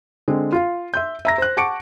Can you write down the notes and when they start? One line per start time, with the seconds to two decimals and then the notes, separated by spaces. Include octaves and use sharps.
0.28 D3 G#3 C4
0.52 F4 F5
0.94 E5 C6 G6
1.25 E5 A#5 A#6
1.38 C5 F#6
1.57 F#5 A5 C#6 D6 C#7 D7